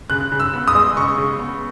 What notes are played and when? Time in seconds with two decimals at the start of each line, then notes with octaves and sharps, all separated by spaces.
0.10 C#3 F#6
0.32 C#3
0.40 E6
0.54 B3
0.68 D#6
0.75 G#3
0.97 C#3 C#6
1.18 C#3
1.39 B3